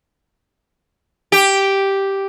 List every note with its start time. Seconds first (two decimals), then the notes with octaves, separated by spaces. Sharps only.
1.32 G4